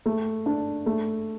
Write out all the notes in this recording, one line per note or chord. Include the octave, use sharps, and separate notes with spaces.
A3
D4
A3